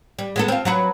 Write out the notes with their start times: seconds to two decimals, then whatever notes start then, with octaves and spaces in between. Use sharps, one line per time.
0.19 G3
0.36 G#3 B3 A4
0.48 C4 F4
0.65 F#3 F#4 B4